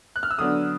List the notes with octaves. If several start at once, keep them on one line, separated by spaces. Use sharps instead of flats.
F#6
F6
E6
D3 F#3 B3 D4 D#6